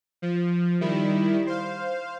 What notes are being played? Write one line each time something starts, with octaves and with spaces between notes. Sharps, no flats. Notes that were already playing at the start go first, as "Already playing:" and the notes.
F3
D#3 G3 E4
C5 F5